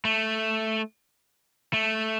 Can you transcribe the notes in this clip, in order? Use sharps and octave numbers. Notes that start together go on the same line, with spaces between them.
A3
A3